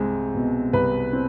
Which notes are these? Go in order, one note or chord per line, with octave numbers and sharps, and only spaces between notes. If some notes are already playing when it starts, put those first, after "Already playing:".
Already playing: C2 G#3 C4
B2
C2 B4
C4